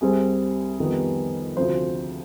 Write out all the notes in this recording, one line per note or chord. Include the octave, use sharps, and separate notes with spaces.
C2 C3 G3 C4 G#4
F2 D#3 G3 B3
D2 C3 F3 C5